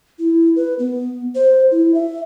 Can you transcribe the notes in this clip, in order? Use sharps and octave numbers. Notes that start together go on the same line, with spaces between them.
E4
B4
B3
C5
E4
E5